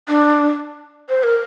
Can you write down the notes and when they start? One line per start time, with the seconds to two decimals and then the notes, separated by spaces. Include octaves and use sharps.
0.08 D4
1.09 C5
1.23 A#4